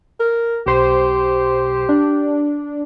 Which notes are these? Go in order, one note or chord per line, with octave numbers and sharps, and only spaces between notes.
A#4
B1 G4 C5
D4